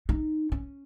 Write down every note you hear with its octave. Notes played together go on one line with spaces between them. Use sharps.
D#4
C#4